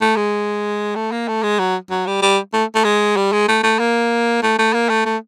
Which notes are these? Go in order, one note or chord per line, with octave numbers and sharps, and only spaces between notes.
A3
G#3
A3
A#3
A3
G#3
F#3
F#3
G3
G3
A3
A3
G#3
G3
G#3
A3
A3
A#3
A3
A3
A#3
A3
A3